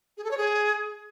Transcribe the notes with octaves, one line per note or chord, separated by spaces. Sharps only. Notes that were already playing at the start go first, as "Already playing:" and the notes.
G#4
A4
C#5
G#4